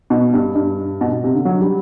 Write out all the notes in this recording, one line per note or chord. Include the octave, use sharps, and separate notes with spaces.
B2
G2
G2
B2
B2
C3
D3
F#3
G3